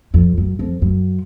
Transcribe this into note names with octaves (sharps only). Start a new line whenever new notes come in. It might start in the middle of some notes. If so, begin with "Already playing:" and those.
F2
F#2
F2
F#2